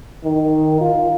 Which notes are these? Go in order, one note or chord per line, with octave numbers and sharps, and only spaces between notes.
D#3
F4